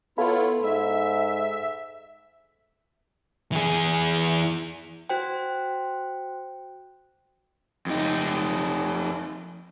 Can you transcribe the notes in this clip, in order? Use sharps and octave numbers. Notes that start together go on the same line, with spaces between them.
B3 E4 F4 A4 C#5 F5 B5
G#2 E5
E3 G#4
F#4 C5 G5
F2 D#4